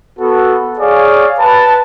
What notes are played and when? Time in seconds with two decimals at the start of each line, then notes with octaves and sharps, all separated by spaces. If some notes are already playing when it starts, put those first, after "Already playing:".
0.19 B3 F#4 A4
0.79 G#4 C#5 D5 F5
1.39 B4 A5